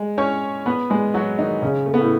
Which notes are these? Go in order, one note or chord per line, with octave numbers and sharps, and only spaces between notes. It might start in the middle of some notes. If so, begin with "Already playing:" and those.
Already playing: G#3
C#4 C#5
B3 B4
G#3 G#4
F#3 F#4
D#3 D#4
C#3 C#4
A3
B3
A2 A3